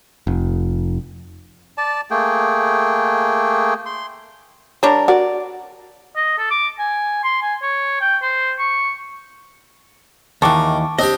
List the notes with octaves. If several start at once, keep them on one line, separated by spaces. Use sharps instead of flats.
F1
D5 A5
A3 A#3 G#4 G5
C6
G3 D4 A#4 C#5
F#4 A#4 D5
D#5
A4
D6
G#5
C6
G#5
C#5
G5
C5
C#6
D#2 D#3 E3 A5 C#6 D6
C4 D4 G4 D#5